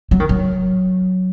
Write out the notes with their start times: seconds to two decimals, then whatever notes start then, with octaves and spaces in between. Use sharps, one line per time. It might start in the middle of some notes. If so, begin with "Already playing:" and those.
0.11 F#3
0.20 D#3
0.29 F#3